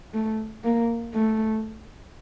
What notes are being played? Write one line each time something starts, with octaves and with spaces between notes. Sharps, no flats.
A3
A#3
A3